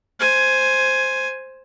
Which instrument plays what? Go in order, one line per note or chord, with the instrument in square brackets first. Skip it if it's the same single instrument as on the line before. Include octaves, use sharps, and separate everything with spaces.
[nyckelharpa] C5 G#5